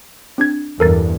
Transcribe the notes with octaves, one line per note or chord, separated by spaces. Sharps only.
C4 D4 G#6
E2 G2 A4 A#4 A6